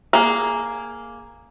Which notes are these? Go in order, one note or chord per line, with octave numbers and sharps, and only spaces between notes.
A#3 G#4